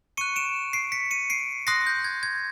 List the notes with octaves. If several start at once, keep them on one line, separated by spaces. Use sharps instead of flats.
C#6 F#6 C#7 D#7
D7 E7
C7 D7
B6 C#7
C#7 D#7
C7 D7
C6 D#6 F#6 A#6 C7
G6
G#6
G#6